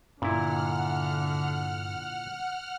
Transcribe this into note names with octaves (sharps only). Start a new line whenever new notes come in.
G2 A#2 D3 E4 F#5 F6